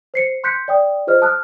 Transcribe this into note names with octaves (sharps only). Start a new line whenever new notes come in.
C5 C7 C#7
C6 F#6 G6 B6 C#7
D5 G5 D#6
F4 G#4 C5 D#5 F6
A5 D#6 F6 F#6